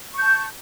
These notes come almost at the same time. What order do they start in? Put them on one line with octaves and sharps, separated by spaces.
C#6 G6 A5